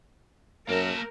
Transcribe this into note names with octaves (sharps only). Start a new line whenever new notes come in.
F#2 A#3 A#4 A5